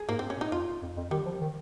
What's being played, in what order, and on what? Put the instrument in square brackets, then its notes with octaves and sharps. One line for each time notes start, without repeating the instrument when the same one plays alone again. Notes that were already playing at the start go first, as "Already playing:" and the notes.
Already playing: [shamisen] G#4
[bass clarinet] G#2 [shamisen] A#3
[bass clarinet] G2 [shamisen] C4
[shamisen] C#4
[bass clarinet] A#2
[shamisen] D#4
[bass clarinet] F2 [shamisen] F4
[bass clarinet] F2
F2
[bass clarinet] D#3 [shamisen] G3
[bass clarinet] F3
D#3